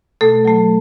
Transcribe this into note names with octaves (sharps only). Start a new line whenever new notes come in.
B2 A3 A4
F#3 A3